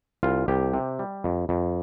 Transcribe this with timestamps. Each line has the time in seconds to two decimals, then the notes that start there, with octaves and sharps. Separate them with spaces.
0.23 C2 F4
0.48 C2 G4
0.74 C3
0.99 G3
1.24 F2
1.49 F2